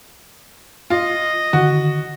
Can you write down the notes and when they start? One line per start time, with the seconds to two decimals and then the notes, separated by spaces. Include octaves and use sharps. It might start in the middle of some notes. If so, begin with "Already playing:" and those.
0.90 F4 D#5
1.53 D3 D#3 F#4